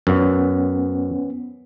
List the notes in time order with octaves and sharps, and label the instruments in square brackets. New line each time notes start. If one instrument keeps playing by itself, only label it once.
[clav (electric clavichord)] F#2 [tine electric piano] B3 C#4